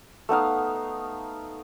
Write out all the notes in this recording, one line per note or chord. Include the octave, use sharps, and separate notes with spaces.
A3 B3 D#4 F5